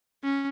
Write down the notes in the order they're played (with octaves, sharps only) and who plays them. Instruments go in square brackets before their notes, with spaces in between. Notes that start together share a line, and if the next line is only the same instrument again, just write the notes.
[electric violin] C#4